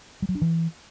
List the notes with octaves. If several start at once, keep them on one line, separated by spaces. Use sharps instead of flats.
G3
F#3
D4
E3